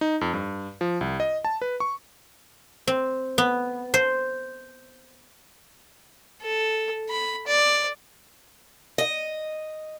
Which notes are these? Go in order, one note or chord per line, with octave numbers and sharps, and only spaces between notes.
D#4
F2
G2
F3
C2
D#5
A5
B4
C#6
C4
B3
C5
A4
B5
D5
D#5